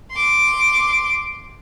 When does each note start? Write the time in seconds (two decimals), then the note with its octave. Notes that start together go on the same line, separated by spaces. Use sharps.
0.12 C6 D6